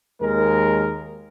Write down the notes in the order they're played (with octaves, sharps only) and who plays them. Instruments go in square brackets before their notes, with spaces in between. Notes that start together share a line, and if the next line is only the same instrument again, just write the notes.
[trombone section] D#2 G#3 A#4